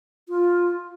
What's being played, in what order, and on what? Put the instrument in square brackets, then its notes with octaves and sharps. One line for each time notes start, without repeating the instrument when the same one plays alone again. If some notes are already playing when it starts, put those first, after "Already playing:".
[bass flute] F4